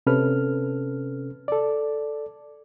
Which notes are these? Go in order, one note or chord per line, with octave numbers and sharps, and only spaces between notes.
C3 C#4 A4 B4 F6
A4 D5